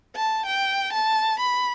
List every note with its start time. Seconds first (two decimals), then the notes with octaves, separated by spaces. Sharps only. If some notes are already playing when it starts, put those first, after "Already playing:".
0.15 A5
0.46 G5
0.93 A5
1.39 B5